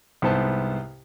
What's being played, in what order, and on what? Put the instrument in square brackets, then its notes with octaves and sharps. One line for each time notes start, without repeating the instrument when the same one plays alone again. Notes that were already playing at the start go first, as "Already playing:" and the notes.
[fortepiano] C2 G#2 B3 C5 A5